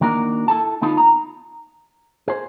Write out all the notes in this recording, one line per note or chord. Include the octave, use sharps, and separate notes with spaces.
D#3 A#3 D4 F#4 A#4
E4 A4 A5
D3 B3 D#4 F4 A4
A#5
G#4 C5